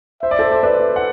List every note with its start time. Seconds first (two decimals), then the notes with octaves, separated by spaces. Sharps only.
0.22 C5 E5
0.31 D5
0.39 A4 C5
0.52 C5
0.63 B4 D5
0.96 F#5